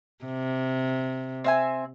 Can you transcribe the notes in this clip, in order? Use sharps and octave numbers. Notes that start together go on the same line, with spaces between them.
C3
C4 E5 G#5